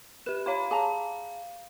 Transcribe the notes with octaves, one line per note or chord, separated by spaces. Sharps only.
G4 B4 E7
F4 C#5 F5 B5
G#4 F5 A5 A#5